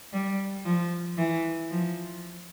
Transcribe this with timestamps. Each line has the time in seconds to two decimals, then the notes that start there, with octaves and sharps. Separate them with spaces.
0.13 G3
0.66 F3
1.18 E3
1.71 F3